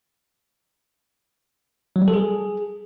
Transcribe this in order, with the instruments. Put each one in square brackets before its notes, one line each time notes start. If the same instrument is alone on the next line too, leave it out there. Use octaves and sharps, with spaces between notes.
[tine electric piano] F#3
G3
A4
G#4